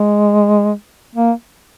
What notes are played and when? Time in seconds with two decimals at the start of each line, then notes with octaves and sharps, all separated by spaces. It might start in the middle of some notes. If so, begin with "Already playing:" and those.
Already playing: G#3
1.15 A#3